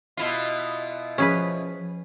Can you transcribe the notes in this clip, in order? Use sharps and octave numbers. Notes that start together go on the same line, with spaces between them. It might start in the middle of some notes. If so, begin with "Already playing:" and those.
B2 E4 F4
F3 C#4 G#4 B4